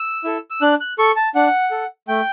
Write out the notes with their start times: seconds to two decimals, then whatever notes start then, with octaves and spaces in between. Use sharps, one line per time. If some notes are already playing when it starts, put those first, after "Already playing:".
Already playing: E6
0.24 E4 A4
0.50 E6
0.62 D4 F#6
0.81 F#6
0.99 A4 C#6
1.16 A5
1.35 D4 F#5
1.71 A4
2.08 A3 G5